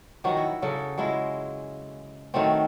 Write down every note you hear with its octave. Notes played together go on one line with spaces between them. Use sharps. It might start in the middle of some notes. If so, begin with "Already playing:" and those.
D#3 F3 F#3 F#4
E4
C#3 F#3 A4
F#3 G#3 E4 F4
D#3 F#3 A3 C4